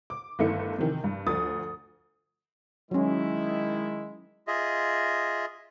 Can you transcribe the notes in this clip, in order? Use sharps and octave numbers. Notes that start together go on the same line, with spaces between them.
D6
G1 D#3 A3 E4 C#7
C3 D#3 E3
G2
D2 F3 D#6 A6
D#3 F#3 G#3 C#4 E4
F4 G#4 D#5 E5